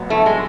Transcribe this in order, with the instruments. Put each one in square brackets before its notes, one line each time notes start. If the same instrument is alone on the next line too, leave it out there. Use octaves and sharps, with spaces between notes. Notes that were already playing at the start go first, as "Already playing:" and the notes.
Already playing: [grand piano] A1 F#3 B3
[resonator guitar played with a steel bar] A3 [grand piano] E4
[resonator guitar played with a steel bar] G#3